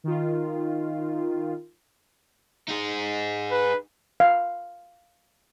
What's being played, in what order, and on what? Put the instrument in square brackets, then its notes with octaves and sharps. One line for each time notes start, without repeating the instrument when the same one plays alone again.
[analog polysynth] D#3 F4
[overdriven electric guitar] D#4 G#4
[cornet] B4
[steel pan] F5